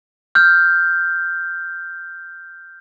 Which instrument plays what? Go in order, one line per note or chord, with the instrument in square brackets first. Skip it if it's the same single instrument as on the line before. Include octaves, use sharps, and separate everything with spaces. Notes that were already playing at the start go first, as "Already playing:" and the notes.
[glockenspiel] F6 G6